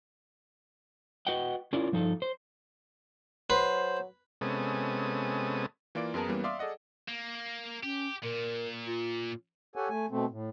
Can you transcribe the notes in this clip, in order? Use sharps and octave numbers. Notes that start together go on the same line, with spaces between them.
F#4 B4 D#5 F#5 G5
C#4 E4 F4 A#4 D5
G2 F3 D#4 G#4 A4
C5
F#3 B4 C5 C6
C3 G#3 B3 C#4 A4 D#6
E3 A#3 F4 D5 D7
F#2 B3 G#4 A#4 A5
E3 G3 A#3 B3 C#4
D5 E5 F5 C6 D6 D#6
G#4 A4 D5 D#5 F#5
A#3
C#4 G4
A#2 A#4
F4
G4 A4 C#5 F#5 G#5
A3 G#5
B2 A3 C4
A2